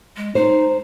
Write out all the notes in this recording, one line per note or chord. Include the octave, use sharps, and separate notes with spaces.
G#3
D#4 C5